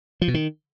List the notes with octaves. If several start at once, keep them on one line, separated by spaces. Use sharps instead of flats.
F3
B2
D#3